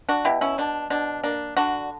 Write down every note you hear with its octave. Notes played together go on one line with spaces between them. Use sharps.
D4 F#4
B2 E4 G4
C#4 E4
B2 D4
B2 D4
A#3 D4
D3 D4 F#4